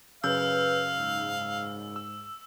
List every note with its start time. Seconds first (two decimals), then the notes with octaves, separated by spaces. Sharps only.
0.24 F#2 C#3 B4 F5 E6 G6
0.97 G#2
1.96 E6